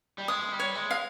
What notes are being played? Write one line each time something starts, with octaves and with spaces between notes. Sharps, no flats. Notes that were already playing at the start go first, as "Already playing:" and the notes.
G3
G#3 D#6
G3
C#5
G#3
F5